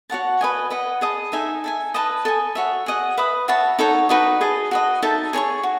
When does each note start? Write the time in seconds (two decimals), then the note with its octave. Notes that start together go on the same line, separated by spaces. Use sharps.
0.10 F#4 C#5 F#5 A5
0.41 B4 D#5 G#5
0.70 B4 D#5 F#5
1.01 G#4 D#5 A5 D#6
1.32 D#4 A4 E5 G#5
1.64 A4 E5 G#5
1.94 B4 D#5 A5 D#6
2.25 A4 D#5 G#5
2.55 F#4 C#5 E5
2.86 G#4 D#5 F#5
3.17 B4 E5 B5 D#6
3.48 F#4 C#5 E5 A5
3.79 D#4 A4 C#5 F#5
4.09 D#4 F#4 B4 D#5
4.41 G#4 D#5 A5
4.71 F#4 B4 D#5
5.02 D#4 A4 E5 A5
5.33 G#4 C#5 G#5 C#6
5.63 F#4